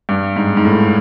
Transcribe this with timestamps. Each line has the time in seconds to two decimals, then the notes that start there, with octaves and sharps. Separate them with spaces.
0.09 G2
0.36 G#2
0.57 G#2
0.65 A2